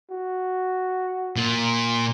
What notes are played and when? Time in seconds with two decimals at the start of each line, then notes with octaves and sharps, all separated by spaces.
0.11 F#4
1.36 A#2